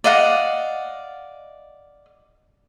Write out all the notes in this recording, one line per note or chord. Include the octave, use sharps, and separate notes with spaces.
D5 D#5 F5 F#5